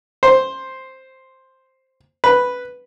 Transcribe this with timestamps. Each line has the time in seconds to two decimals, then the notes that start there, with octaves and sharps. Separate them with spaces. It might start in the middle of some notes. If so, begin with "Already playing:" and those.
0.23 C5
2.24 B4